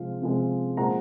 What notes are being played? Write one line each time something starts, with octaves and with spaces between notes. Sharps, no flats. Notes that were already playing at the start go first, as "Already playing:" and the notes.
Already playing: C3 F3 G#3 F5
C3 F3 G#3
A#2 F3 G#3 F#5 A#5